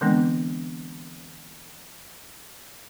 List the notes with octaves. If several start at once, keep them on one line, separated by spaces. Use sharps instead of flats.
D3 E3 G#3 B3 C4 D4